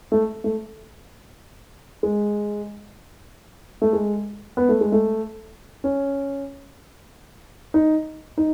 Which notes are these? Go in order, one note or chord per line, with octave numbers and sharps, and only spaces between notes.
A3
A3
G#3
A3
G#3
B3
A3
G#3
A3
C#4
D#4
D#4